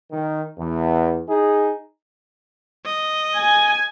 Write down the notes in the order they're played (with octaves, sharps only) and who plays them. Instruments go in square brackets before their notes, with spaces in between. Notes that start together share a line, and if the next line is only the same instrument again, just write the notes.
[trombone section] D#3
E2
D#4 G#4
[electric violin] D#5
[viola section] G#5